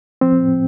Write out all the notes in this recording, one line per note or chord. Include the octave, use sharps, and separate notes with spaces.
F3 C4
A2